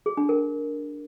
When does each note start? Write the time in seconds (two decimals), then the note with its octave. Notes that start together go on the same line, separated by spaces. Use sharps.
0.06 G#4
0.17 D4
0.29 A#4